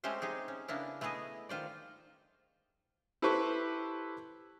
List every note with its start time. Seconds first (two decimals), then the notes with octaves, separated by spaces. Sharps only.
0.04 G#3 A3 C4 C#4 G4 C5
0.22 D#4 G4 G#4
0.48 C#4
0.68 C#3 A#3 B3 D4 E4
1.01 A3 B3 E4 G#4 D#5
1.49 D#3 F4 C5 D5
3.22 E4 G4 A4 B4 C5 C#6